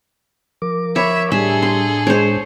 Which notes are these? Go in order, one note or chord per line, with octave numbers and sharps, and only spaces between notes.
F3 A#4 D6
C#5 E5 B5
A2 G3 D4 G#4 A4 E5
C6
G#3 C5 C#5